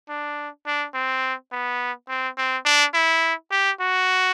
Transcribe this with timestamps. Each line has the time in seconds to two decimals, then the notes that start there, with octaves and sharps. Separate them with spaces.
0.09 D4
0.66 D4
0.94 C4
1.52 B3
2.09 C4
2.38 C4
2.65 D4
2.94 E4
3.51 G4
3.80 F#4